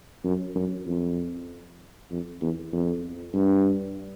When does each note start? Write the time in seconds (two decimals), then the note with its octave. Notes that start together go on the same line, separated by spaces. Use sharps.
0.24 F#2
0.55 F#2
0.86 F2
2.10 F2
2.41 E2
2.72 F2
3.34 G2